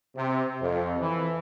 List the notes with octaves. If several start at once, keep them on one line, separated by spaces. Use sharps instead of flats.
C3
F2
E3